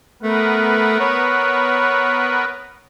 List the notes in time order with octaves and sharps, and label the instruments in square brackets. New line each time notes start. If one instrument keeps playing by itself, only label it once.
[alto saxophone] A3 [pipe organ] B3 A#4 B4
[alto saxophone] C#5